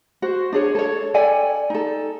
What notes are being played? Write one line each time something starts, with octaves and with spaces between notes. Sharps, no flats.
F#4 C5
D4 G#4 C#5
A4 C#5
A4 D5 G5 G#5
D#4 A4